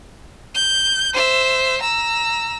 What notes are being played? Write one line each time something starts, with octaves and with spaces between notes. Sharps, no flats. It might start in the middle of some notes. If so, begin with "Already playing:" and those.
G6
C5 E5
A#5 E6